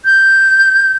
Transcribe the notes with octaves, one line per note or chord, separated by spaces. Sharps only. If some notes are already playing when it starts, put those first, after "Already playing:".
G6